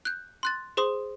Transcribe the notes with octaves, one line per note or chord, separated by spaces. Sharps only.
F#6 G6
C6 F#6 A6
G#4 C5 C6 D#6